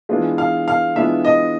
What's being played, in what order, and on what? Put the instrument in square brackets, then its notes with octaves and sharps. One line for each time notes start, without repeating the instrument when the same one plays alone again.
[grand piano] E3 G#3 B3 D4 F4
[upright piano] F5
F5
[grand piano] E3 G#3 B3 D4 F4 [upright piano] E5
[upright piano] D#5